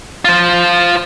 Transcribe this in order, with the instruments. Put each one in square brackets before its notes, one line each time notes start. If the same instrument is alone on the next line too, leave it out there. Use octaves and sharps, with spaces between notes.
[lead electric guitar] F4 C5